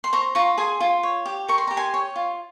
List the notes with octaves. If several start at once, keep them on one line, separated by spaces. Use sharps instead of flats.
C6
C5 A#5 C#6
F4 A#5 C#6
G#4 G#5 C6
F4
C#5
G4
A#4 C#6
C6
G4 A#5
G#5 C6
C#5
F4